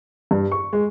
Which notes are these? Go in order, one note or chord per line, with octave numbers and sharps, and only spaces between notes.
G2
C#6
G#3